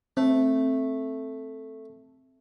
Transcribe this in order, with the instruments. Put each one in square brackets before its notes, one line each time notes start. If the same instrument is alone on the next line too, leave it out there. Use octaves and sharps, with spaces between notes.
[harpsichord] A3 [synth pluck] C4